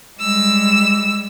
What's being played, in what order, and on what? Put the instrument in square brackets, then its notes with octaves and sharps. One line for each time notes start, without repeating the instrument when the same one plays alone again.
[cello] G3 G#3 [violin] E6